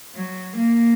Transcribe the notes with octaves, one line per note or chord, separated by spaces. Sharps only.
F#3
A#3